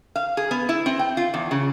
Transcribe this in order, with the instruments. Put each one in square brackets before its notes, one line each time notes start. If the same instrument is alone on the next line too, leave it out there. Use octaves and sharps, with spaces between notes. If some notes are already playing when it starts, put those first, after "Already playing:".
[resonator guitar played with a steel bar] F5
G#4
B3
E4
C4
G5
F4
E2
C#3